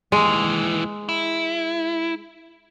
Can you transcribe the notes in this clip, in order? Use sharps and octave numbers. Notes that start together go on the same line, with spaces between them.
D#2 E3 G#3
E4